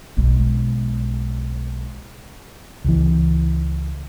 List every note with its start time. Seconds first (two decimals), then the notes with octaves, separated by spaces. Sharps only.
0.17 B1 G#3
2.84 C#2 E3